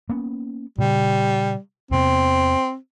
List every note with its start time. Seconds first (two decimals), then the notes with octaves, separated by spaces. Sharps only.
0.09 A#3 B3 C#4
0.78 A#2 C#3 G3
1.91 E2 C3 B3 C4